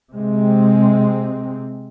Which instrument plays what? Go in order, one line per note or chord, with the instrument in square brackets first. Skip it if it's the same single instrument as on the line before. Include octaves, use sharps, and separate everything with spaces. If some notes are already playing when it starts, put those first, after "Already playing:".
[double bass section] C3 G#3 C4